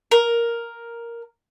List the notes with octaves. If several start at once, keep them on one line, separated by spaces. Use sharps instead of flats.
A#4